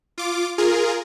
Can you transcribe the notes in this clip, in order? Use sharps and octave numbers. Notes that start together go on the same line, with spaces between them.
F4 D6
F4 G#4 A#4